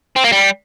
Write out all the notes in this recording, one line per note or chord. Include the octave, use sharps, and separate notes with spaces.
C4
A#3
G3